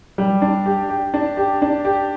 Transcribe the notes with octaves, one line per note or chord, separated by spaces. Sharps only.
G3
D4
G4
G4
D4
G4
D4
G4